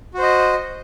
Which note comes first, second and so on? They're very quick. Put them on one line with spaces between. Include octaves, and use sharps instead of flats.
F#4 C5 D#5